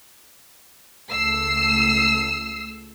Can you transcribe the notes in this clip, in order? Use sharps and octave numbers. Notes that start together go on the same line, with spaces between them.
C#2 A3 E6 C7